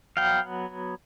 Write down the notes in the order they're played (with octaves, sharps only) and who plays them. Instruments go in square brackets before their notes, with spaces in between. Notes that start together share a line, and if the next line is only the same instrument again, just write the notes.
[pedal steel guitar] F#3 B3 F5 G5